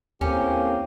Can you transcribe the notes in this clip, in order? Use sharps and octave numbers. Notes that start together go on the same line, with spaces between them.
D#2 A2 A#3 C4 C#4 G4